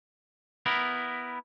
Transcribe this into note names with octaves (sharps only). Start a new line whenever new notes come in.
B3 E4 A#4